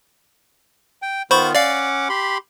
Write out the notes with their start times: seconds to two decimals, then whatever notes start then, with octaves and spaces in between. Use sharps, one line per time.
1.02 G5
1.31 D#3 B3 F4 C5 B5 C#6
1.55 C#4 D5 F5 F#5 D6
2.09 G4 B5 C6